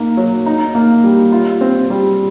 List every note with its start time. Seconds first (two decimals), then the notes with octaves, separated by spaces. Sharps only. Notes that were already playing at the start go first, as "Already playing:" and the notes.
Already playing: A#3 D#4
0.17 F#3
0.46 D#4
0.75 A#3
1.04 G3
1.32 F4
1.61 C4
1.90 G3